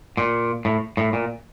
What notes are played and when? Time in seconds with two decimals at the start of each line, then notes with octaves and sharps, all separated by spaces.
0.17 A#2
0.65 A2
0.97 A2
1.13 A#2